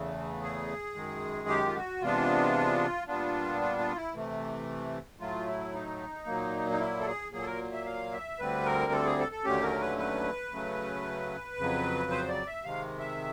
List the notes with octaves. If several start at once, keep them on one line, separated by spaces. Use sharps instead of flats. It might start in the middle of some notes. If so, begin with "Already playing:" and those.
Already playing: E2 C#3 E3 A3
G#4
F#2 D#3 G#3
G4
F4
F#4
C3 E3 G#3 B3 D4 F4
A#2 G3 B3 D4 F4
F4
F4
E4
C3 E3 A3
A2 F#3 A3 F4
E4
D#4
A#2 F#3 A#3
D#4
E4
A4
G#4
A#2 F#3 A#3 G#4
A4
A#4
E5
F5
E5
D2 D3 G3 C4 B4
A#4
A4
G#4
A4
A4
D#2 D3 F#3 A3 C#4 G4
A#4
B4
B4
C#3 F#3 A3 C#4
F2 C#3 F#3
C5
D5
E5
C3 D#3 G#3 F5
E5